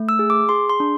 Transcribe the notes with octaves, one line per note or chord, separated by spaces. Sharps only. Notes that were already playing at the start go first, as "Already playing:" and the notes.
Already playing: A3
E6
G#4
D6
G#4 C6
C6
D4